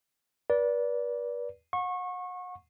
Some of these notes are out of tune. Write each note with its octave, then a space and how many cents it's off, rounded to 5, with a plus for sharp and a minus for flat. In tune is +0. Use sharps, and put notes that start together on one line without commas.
B4 -35 D5 -15
F#5 -35 C#6 -25